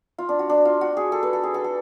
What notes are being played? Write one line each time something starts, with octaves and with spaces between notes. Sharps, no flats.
F4
D4
F#4
D4
F4
F#4
G#4
A4
B4
A4
G#4
A4
A4